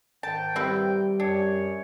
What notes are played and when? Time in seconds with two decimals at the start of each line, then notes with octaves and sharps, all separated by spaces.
0.23 G#2 D#3 G5 A5
0.56 G3 C4 E4 B4
1.20 F#2 D4 C#5